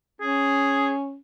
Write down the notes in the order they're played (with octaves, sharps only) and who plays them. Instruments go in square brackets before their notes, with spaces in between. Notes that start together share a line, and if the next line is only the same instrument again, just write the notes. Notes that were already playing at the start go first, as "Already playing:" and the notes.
[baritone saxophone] C#4 [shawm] G#4